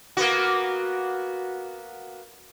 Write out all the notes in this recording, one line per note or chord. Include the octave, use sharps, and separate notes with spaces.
A#3 B3 F#4